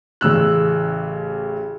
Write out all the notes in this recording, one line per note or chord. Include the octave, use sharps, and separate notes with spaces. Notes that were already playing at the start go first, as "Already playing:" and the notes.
A1 C#3 E6 F#6